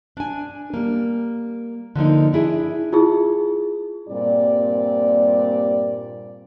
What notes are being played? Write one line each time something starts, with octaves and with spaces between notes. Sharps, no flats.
D4 G#5
G3 A#3
D3 F3 A#3 D#4
D4 E4 G#4 E5
E4 F4 G#4
G2 A#2 G3 C4 D5